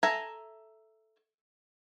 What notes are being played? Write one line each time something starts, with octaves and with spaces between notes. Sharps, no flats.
A4 E5 G#5 A#5